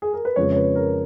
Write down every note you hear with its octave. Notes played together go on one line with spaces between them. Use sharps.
G#4
A#4
B4
F2 C#3 G#3 C#5
C#5
B4
A#4